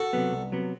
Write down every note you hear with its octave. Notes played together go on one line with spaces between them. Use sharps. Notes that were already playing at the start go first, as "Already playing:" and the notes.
Already playing: F#4 A4
C3 F#3 B3
C2
C3 F#3 B3